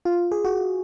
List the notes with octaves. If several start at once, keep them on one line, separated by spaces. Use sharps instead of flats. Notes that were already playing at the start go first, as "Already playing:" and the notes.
F4
G#4
F#4